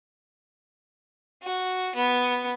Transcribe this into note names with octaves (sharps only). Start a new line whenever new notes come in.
F#4
B3